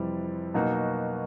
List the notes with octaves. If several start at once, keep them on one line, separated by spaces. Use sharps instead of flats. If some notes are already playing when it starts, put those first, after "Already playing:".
Already playing: F2 C3 E3 G3 C4
B2 F#3 A#3 D#4 F#4